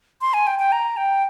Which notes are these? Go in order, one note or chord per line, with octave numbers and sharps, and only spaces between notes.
C6
G#5
G5
G5
A#5
G5